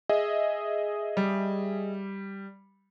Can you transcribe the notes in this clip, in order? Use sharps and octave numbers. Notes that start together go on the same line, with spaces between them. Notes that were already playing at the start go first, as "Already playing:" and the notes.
G#4 D#5 E5
G3